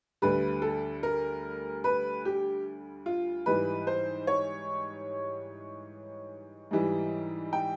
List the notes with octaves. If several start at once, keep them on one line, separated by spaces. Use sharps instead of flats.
D2 D3 G3 B4
A4
A#4
B4
G4
F4
G#2 E3 G3 B4
C5
C#5
G#2 E3 G3
G5